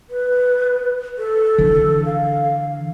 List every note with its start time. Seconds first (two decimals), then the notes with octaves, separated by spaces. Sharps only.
0.10 B4
1.18 A4
1.58 D3 E3
2.05 F5